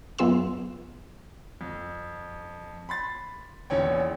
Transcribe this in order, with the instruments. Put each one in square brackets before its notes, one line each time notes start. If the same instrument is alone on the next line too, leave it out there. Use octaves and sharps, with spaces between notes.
[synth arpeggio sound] F#2 B3 F4 G#4 C6 E6
[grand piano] F2
B5 C6 A6
E1 A#1 E2 C#4 C#5 G5